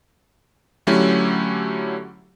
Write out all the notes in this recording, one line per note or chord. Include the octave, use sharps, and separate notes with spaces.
D3 F#3 A3 C#4 E4 G4